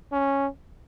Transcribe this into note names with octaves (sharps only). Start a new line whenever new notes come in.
C#4